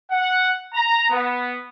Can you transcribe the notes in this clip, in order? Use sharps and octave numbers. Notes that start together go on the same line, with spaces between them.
F#5
A#5
B3